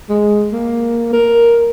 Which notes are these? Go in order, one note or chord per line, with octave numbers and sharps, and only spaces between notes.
G#3
A#3
A#4